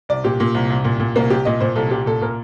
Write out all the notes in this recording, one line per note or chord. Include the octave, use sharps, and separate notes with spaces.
C2 D5
A#2 G4
A#2
C2
C2
A#2
A#2
C2 A#3
C2 G4
A#2 D#5
A#2 C5
C2 A4
C2 G4
A#2 A4
A#2 A#4